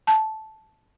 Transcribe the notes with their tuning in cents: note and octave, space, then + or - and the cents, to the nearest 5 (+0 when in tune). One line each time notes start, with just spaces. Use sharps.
A5 -10